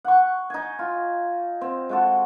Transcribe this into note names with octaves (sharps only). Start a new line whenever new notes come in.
F#5 C#6
D#4 G#5
F4
C4
G#3 F#4 A4